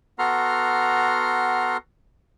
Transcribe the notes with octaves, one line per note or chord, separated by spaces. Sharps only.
B3 F#4 A4 A#5 C6 F6